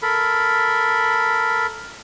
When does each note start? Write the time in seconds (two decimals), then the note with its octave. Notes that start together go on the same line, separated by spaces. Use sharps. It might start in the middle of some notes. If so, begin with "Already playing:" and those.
0.02 A4 A#4 B5